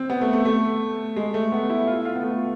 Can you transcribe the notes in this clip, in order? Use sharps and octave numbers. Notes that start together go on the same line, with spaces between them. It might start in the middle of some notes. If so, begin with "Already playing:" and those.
Already playing: C4
B3
A3
A3
A3
G#3
A3
B3
E4
F4
F4
B3
A3